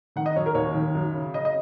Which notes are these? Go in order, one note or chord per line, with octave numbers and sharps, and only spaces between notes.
D#3 F#5
D#5
F#2 C#5
A#4
D#2 C#5
D#3
F#2
C#3
C#3 D#5
D#5